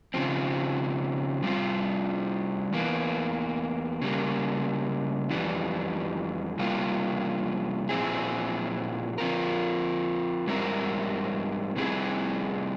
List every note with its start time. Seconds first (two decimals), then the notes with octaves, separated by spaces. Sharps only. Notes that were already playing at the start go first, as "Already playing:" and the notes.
0.14 C#3 F3 C4
1.43 C3 G3 C4 F4
2.73 E2 E3 A#3
4.02 C#3 G3 A#3
5.31 F2 E3 G3
6.59 C3 G3 A#3 F4
7.89 A#2 F3 C4 E4 G#4
9.18 F3 C4 F4 A#4
10.47 G#2 G3 C4 E4 A#4
11.76 C3 G3 C4 E4 G#4